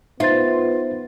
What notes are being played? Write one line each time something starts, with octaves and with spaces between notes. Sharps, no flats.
B3 D#4 F4 C5 E5 A6